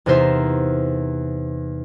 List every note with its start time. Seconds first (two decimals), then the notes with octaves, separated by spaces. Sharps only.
0.06 E2 C3 D#4 A#4 C5 E5